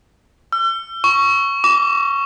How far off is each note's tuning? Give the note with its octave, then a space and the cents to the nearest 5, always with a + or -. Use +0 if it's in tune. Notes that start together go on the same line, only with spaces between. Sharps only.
E6 +40
C#6 +5
D6 -35